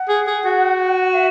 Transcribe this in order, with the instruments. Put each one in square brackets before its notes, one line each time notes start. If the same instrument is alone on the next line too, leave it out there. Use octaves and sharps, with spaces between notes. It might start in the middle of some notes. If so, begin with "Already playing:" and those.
Already playing: [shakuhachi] F#5
[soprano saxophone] G#4
G#4
F#4
[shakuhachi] E5